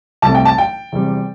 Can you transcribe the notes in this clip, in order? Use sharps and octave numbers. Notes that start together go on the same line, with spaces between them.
C2 C3 A3 A5
G5
A5
G5
E2 C3 G3